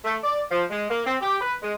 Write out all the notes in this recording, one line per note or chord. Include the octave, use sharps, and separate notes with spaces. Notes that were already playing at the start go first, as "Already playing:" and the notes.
A3
D5
F3
G#3
A#3
C4
G4
B4
G#3